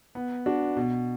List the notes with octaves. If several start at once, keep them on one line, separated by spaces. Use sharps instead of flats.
B3
D4 F#4
B2